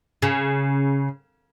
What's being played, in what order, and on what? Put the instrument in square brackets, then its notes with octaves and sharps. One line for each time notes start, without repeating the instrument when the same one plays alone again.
[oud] C#3